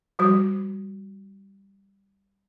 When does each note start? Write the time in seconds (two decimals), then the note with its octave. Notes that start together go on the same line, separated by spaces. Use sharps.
0.19 F3 G3 F#4 C5